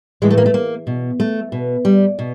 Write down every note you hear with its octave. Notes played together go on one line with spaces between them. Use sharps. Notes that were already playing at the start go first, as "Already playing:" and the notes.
A2 E3 G#3
A3
A#3
A3
A#3
B2
A3
B2
G3
B2